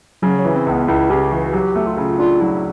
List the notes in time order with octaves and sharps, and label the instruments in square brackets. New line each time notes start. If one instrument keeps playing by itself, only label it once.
[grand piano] C#3 [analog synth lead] F#3
[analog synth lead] F#3
[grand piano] E3
[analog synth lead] C4
[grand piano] C#2 [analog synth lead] B3
[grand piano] C#2 [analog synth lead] E4
[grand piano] C#3 [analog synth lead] G4
[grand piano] E3 [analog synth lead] F#4
[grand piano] F#3 [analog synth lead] G4
[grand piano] A3
[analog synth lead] F4
[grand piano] C#3
[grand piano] D4 [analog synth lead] F4
[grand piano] F#3 [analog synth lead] E4